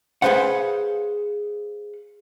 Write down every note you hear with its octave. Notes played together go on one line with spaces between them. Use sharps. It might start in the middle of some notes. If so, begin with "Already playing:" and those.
G#4 A4 B4 C5 F5 F#5